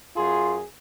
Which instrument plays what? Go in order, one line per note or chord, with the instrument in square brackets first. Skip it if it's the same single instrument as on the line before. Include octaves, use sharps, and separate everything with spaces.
[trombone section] F#2 G#4 [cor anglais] F4